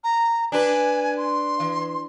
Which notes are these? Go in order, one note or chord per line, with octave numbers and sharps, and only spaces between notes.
A#5
D4 B4 G#5
C6
E3